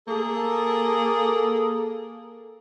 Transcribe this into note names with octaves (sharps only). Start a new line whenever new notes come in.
A#3 G#4 A4